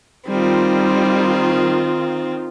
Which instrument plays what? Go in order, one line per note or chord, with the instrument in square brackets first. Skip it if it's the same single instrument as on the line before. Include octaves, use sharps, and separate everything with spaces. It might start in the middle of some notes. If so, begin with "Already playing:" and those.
[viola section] D#3 F4 [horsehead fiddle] G3 [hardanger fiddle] C4